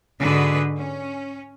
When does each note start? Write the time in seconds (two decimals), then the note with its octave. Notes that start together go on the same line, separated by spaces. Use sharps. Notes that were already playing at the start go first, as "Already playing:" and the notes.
0.19 G#2 D3 F#4 G#4 B4 D#5
0.77 C#4